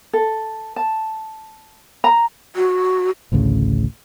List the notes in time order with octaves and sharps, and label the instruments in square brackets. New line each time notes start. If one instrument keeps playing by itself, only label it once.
[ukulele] A4
A5
A#5
[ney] F#4
[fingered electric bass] A1 D2 A2 C#3